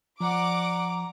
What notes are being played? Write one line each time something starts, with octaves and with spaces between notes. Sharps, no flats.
F3 D5 F#5 A#5 D6